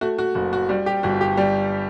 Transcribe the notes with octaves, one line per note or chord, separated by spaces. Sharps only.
A3 F#4
F#4
F#1 F#4
F#4
G3 F#4
G4
G1 F#4
G4
G3